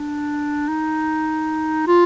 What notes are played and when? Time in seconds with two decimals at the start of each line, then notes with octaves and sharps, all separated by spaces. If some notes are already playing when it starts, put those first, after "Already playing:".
Already playing: D4
0.68 D#4
1.87 F4